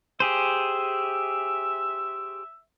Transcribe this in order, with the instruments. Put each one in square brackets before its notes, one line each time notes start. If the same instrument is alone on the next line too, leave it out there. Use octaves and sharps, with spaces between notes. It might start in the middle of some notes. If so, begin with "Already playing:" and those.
[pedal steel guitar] G4 G#4 C5 [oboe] E5